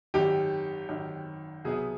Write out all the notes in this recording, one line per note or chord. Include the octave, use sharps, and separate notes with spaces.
G#1 F#2 D#3 G4
G#1 F#2 D#3
C2 B2 F#3 B3 E4 G#4